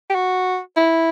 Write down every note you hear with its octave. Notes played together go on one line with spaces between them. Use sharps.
G4
F#4
E4